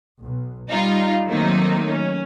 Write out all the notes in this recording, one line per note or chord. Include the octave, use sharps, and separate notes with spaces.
B1
G3 D#4 F4
D#3 F#3 A3 A#3 C4 D#4
C#4